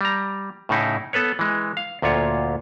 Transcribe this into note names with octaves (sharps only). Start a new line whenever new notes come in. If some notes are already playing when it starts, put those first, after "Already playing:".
G3 A#5
A2 C#3 D#4 E4
B3 A4 B4 C#5
E3 G#3
F5
D2 A#2 F4 C#5